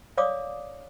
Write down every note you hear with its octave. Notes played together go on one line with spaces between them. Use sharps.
C#5 D5 F5 D6 D#6